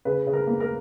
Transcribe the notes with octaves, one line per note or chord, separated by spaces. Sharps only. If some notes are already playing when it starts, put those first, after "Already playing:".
C#3 B4
C#3
A#4
A#3
A#4